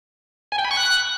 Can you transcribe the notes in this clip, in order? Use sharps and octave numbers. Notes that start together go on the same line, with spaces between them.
G#5
G5
B5
C#6
F#6